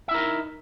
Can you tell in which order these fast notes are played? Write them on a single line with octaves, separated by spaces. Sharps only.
E5 E4 A#4 D#4